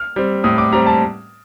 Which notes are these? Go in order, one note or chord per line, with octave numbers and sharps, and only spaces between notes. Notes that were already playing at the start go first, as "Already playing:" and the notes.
Already playing: F6
G3 C4
A2 D#6
D6
G3 C4 A#5
A5